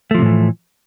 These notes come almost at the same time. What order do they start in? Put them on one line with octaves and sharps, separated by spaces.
A3 F3 C3 A2 E3